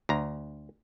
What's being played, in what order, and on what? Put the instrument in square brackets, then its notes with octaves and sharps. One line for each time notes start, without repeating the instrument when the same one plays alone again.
[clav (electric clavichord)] D2 A#5